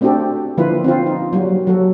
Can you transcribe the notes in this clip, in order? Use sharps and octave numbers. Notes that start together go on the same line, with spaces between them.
A3 C4 D4 F#4 G4 A4
D3 F3 A#3 E4 F4 B4
C4 F4
D#4
F#3 G3 A#3 F#4
F#3 F#4 A4